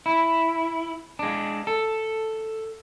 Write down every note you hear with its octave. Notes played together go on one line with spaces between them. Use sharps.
E4
G#3 D4
A4